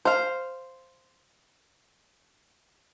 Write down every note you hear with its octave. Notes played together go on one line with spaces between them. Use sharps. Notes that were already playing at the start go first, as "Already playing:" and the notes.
C5 F5